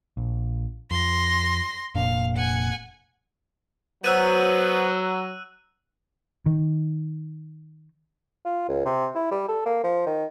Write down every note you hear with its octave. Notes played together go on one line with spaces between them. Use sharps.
A#1
F2 C6 A#6
F1 A#2 D4 F5
F#5 G#5
F#3 B3 C5 E6 F#6 D#7
D#3
F4
C#2
C3
E4
G3
A4
A#3
F3
D#3